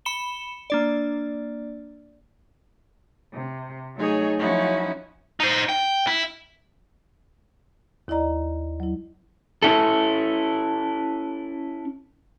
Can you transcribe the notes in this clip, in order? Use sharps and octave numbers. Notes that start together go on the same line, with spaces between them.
B5 C#7 E7 G7
A#3 D4 D5
C3
F#3 A3 D#4 G#4 C#5 G#5
F3 F#3 C#4 D#4 E4 F#4
D#4 C5
G5
E4
D#2 E4 D5 D#5 A#5
F#3 E4
C#4 E4 A4